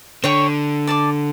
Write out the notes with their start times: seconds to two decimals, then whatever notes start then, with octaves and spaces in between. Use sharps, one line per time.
0.24 D3 C#5 G5 C#6
0.87 D5 A5 D6